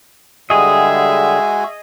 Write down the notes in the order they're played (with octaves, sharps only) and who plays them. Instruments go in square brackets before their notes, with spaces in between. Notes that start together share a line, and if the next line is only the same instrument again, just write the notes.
[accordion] D3 G3 [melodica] G#3 F#4 G#5 [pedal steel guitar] G#4 D#5 [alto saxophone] E5